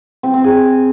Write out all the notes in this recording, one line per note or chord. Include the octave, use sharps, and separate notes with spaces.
C4
C4
G#4